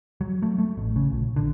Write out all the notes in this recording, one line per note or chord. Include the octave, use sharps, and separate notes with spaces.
F#3
A3
A3
A1
C#3
A#1
D3